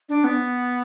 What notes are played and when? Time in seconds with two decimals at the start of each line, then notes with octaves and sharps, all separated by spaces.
0.09 D4
0.24 B3